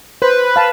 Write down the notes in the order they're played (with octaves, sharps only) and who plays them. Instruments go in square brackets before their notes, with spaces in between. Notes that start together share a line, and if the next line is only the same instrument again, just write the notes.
[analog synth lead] B4 [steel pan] C5
[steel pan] F5 A5